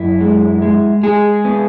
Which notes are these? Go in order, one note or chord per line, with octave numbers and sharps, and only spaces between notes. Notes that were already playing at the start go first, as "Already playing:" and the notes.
Already playing: F#2 E4
G#3
G#3
G#3 G#4
B3